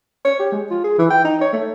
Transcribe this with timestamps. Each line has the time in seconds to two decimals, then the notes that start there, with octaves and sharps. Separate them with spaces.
0.25 C#5
0.39 G4
0.52 G#3
0.70 F4
0.84 G#4
0.99 E3
1.10 G5
1.24 D#4
1.41 C#5
1.53 A3